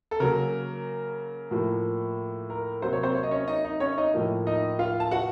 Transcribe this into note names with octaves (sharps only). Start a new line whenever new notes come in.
A4
C#3 F#3 A#3 A#4
A2 F3 A#3
A#4
C3 F#3 A#3 C5
C#5
C4 C5
C#5
D#5
C#4 C#5
D#4 D#5
D#4 D#5
C#4 C#5
D#4 D#5
A2 F3 A#3
D#4 D#5
F4 F5
A5
F#4 F#5